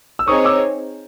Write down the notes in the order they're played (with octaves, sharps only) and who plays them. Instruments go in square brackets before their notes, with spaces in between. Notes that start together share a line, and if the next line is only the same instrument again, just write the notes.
[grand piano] E6
[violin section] C4 D#4 G#4 C#5 [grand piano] C#6 D#6
[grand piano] D6 E6